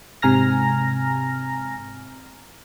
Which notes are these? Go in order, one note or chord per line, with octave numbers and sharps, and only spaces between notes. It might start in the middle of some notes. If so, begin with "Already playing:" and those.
G#2 C3 G#5 A#5 F6 A#6